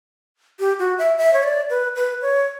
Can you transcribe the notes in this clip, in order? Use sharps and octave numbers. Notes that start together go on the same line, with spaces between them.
G4
F#4
E5
E5
C#5
D5
B4
B4
C#5